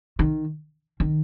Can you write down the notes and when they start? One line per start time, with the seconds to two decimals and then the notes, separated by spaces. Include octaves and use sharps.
0.19 D#3
1.00 D#3